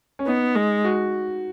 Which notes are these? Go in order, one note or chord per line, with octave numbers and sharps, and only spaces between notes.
C#4
B3 D#4
G#3
F#4